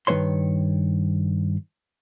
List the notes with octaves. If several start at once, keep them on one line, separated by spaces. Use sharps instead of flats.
G2 D#3 G3 B4 C#5 C6